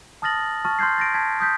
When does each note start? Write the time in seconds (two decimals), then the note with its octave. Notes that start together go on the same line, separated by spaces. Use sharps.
0.22 A5 D#6 F6 A6 A#6 F#7
0.65 A5 C#6 F6 A6
0.79 C6 F6 G6 G#6 C7
0.98 A6 A#6 D7
1.14 A5 G#6 B6
1.40 D#6 G6 B6